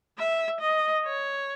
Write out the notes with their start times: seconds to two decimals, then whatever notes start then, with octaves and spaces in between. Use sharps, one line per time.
0.18 E5
0.61 D#5
1.05 C#5